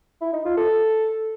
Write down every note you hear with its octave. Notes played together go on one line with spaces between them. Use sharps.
E4
D#4
F4
A4